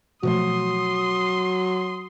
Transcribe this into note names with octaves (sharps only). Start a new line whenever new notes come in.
B2 F3 F#3 A3 C6 D#6